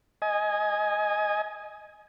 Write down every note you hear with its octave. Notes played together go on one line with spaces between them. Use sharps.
D#5 G#5